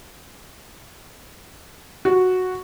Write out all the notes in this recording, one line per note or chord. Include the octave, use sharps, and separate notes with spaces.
F#4